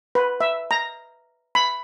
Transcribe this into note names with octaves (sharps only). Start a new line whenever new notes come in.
B4
E5
A#5
B5